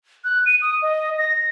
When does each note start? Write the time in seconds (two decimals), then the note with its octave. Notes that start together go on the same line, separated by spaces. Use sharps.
0.24 F#6
0.46 D#7
0.62 D#6
0.82 D#5
1.18 A#6